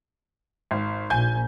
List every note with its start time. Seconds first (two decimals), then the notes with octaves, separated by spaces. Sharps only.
0.71 G#1
1.10 A#1 A#2 G#5 G6